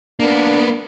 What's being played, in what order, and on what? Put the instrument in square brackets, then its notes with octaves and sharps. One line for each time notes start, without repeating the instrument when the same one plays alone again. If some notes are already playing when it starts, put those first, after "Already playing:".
[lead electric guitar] A#3 B3 [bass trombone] D4